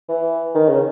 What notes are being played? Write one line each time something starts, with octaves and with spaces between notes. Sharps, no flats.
E3
D#3
C#3